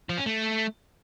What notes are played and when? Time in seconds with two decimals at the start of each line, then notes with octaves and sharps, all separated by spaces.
0.09 F3
0.18 C#4
0.26 A3